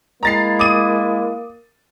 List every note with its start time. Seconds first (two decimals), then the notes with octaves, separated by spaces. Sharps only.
0.23 G#3 A#3 E4 A#5 A6 C7
0.59 D6 D#6 D#7